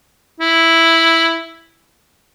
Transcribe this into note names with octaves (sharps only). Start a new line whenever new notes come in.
E4